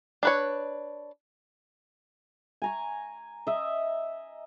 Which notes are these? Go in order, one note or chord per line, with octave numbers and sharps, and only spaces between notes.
D4 B4 C#5
G#5 A#5 C#6
D#5 E5